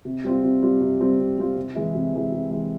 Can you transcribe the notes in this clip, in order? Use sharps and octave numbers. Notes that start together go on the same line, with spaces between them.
C3
G3 C4 F4
C3
G3 C4 F4
C3
G3 C4 F4
C3
G3 C4 F4
C3
E3 G#3 E4
C3
E3 G#3 E4
C3
E3 G#3 E4